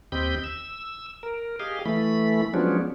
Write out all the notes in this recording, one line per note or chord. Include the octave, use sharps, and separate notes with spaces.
D#2 C4 G4 D#5 B5 G6
E6
A#4
G4 G#4 D#5 F5
E3 A3 B5
F3 F#3 G#3 B3 C#4 D4